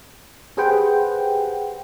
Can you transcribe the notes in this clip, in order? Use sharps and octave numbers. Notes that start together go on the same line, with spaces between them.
G4 G#4 B4 C5 F#5 G5